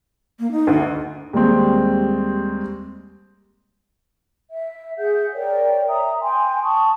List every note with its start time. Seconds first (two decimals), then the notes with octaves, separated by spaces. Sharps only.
0.40 A#3
0.52 D#4
0.67 D2
1.33 D#2 G3 G#3 C4
4.51 E5
4.98 G#4 E5 F#5 G6
5.34 A#4 C#5 D5 G5
5.88 E5 A#5 D#6
6.21 G5 G#5 C6
6.63 A5 C#6 D#6